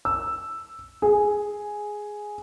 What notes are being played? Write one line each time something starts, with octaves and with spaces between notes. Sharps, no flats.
E6
G#4